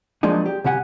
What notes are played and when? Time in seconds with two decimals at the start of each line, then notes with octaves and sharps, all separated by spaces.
0.23 F3 F#3 G#3 A#3 D4 D#4
0.46 G4
0.64 C2 C#3 G4 F#5 G#5